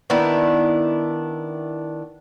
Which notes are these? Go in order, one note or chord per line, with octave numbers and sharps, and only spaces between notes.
D#3 B3 D4 E4